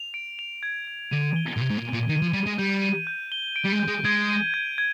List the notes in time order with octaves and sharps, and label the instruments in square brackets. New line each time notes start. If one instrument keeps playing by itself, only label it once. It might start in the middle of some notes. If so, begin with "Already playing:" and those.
Already playing: [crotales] F7
D7
F7
G#6
G#6
[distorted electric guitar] D3 [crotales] D#7
[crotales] G7
[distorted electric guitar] A#2
[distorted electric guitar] C3 [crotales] G#6
[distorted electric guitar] G#2
A#2
[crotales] D#7
[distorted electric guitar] A#2
[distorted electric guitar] D#3 [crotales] D#7
[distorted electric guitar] F3
[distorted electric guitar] G3 [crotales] D#7
[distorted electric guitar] G#3
[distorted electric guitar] G3 [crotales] G6
[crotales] D#7
G6
G7
D7
[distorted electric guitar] G3
G#3
[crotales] G6
[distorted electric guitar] G#3
[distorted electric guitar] G#3 [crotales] G#6
[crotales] D#7
G#6
G#6